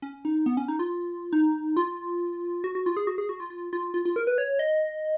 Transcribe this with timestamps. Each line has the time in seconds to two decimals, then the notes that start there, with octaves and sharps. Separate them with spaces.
0.02 C#4
0.25 D#4
0.46 B3
0.57 C#4
0.68 D#4
0.79 F4
1.33 D#4
1.77 F4
2.64 F#4
2.75 F#4
2.86 F4
2.97 G#4
3.07 F#4
3.18 G#4
3.29 F#4
3.40 F4
3.50 F4
3.73 F4
3.94 F4
4.05 F4
4.16 A#4
4.27 B4
4.38 C#5
4.59 D#5